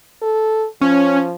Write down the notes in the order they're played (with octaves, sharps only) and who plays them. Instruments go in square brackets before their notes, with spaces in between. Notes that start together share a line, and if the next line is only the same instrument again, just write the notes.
[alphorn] A4
[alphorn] F3 [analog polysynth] C#4